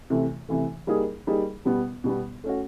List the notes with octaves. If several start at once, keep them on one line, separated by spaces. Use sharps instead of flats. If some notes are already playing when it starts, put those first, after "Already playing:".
C3 E3 A3
C3 E3 A3
G3 A#3 D#4 G#4
G3 A#3 D#4 G#4
B2 G3 B3
B2 G3 B3
A3 C#4 F#4